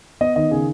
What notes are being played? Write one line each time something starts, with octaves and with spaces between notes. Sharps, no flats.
B3 D#5
D#3 D#5
C#3 G#4